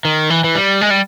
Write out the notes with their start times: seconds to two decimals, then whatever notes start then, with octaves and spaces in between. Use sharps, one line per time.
0.05 D#3
0.30 E3
0.44 E3
0.55 G3
0.81 G#3
0.90 G3